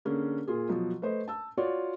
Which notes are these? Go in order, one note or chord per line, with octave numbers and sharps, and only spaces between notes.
D3 A#3 C#4 G#4
A#2 F4 G#4
B2 F3 F#3
A3 B4 C5 D#5
A5 E6
F4 F#4 C#5 D5